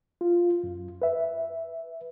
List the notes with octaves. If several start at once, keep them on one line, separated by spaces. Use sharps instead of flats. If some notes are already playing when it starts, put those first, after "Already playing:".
F4
F#2
B4 E5